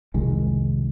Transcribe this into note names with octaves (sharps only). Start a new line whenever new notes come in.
F1 C2 D#3 G#3